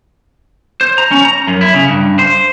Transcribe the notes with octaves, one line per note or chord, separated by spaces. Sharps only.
C5
A#5
C#4
A#5
F#2
E4
C#3
G2
C5